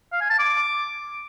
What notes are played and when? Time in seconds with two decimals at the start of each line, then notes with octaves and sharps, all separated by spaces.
0.12 F5
0.21 G#5
0.30 A5
0.39 D6